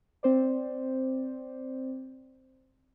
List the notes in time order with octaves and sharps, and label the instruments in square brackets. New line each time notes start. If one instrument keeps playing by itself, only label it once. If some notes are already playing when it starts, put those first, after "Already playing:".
[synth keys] C4 C5 D5